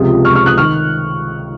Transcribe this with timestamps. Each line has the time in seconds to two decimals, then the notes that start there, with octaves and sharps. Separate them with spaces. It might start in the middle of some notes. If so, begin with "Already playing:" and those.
Already playing: C#2 C3 F3 G#3 D#6
0.25 C#6 F6
0.35 C#6 F6
0.46 D#6 F#6
0.57 D#3 C#6 F6